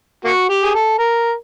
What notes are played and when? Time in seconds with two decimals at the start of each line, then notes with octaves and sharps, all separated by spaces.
0.25 A#3 F#4
0.49 G4
0.64 G#4
0.75 A4
0.99 A#4